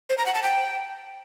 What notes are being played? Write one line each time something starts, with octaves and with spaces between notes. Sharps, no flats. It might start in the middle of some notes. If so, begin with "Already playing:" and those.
C5
A#5
F#5
A5
G5